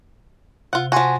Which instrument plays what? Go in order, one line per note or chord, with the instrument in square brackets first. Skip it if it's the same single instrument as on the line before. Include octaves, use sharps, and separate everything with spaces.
[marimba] C3 [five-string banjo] F4 F#5
[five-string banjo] F3 F#4 [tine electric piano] F#5 G#5 C6